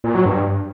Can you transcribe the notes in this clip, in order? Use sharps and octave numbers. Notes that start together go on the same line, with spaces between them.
A#2
F#3
G2